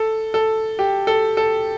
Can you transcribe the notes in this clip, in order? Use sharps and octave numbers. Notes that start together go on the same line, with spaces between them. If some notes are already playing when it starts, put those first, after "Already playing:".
Already playing: A4
A4
G4
A4
A4